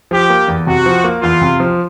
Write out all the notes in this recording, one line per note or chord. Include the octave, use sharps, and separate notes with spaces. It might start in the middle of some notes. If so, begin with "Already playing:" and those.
F3 G4
A#3
E2
C3 F#4
F3
A#3
E2 F4
C3
F3